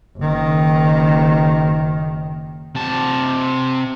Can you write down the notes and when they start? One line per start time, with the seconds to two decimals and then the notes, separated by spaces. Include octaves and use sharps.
0.17 F#1 D#3
2.75 C3 A5